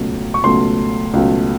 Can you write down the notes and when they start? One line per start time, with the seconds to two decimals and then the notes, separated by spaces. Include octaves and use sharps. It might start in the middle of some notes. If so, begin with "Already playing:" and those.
Already playing: C#2 B2 F#3 A3
0.34 C#6
0.44 C#2 B2 F#3 A3 C6
1.14 C#2 B2 F#3 A3